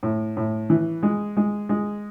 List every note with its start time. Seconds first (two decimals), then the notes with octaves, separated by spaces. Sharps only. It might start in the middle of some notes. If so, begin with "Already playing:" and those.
0.03 A2
0.37 A2
0.70 E3
1.03 G#3
1.37 G#3
1.69 G#3